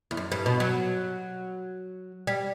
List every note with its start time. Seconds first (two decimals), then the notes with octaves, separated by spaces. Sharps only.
0.11 E2
0.17 F#2
0.32 G2
0.46 B2
0.60 F#3
2.27 G3